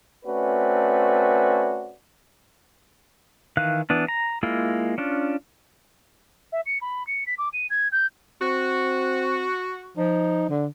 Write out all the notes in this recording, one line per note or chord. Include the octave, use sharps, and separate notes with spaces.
A3 C4 C#4 F#4 B4 D5
D#3 E3 F5 F#6
E3 B3 D4
A#5
G#3 A#3 E4 F4
C#4 D4 F4
E5
C#7
B5
C#7
B6
D6
D#7
G#6
G6
C4 F#4
F3 D#4
D3